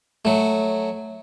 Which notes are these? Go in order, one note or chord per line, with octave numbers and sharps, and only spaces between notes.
F#3 A3